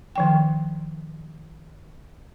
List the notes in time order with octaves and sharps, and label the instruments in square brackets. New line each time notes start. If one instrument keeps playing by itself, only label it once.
[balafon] D#3 F3 G5